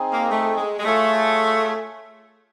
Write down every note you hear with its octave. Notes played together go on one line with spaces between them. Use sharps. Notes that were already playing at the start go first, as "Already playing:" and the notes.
Already playing: C4 D#4 G#4
A#3
A3
G#3
G#3
A3 F4 G#4 C#5 E5